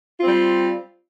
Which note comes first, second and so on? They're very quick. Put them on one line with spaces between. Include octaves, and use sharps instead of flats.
F4 C4 G3